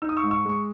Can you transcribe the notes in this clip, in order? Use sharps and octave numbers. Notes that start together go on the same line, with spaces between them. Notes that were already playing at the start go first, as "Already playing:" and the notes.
D#4 E6
D#6
C#6 E6
G#2
C#6 E6
G#3 C#6